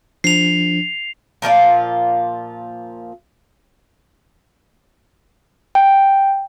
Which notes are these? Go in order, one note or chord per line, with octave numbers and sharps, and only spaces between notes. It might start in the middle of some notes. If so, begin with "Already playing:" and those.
F3 D4 C7 F7
A#2 F3 F4 D5
G5